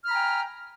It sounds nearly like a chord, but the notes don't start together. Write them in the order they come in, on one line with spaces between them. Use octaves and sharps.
F6 B5 A#5 G#5 G5